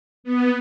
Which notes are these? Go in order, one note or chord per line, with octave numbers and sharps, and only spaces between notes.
B3